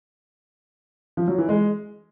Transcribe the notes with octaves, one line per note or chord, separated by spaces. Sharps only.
F3
F#3
E3
G#3